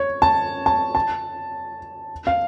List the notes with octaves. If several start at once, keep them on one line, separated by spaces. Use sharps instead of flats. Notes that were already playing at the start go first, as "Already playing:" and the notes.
Already playing: C#5
A5
A5
A5
F5